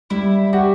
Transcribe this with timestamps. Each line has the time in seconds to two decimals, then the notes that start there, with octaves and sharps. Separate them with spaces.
0.10 G3 E4
0.53 F#4 G4